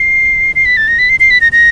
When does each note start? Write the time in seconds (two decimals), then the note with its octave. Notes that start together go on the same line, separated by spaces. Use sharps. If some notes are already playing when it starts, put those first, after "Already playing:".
Already playing: C7
0.55 C7
0.65 B6
0.77 A6
0.88 A#6
0.99 B6
1.09 C7
1.20 C7
1.30 B6
1.41 A#6
1.52 A#6